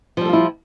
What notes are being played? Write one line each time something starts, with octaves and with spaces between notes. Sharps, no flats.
F3 G3 E4 F4 A4